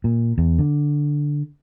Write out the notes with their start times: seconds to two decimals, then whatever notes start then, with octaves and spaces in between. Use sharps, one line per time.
0.04 A#2
0.38 E2
0.59 D3